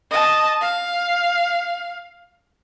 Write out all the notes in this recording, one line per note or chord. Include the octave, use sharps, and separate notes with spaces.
D#5 A5
F5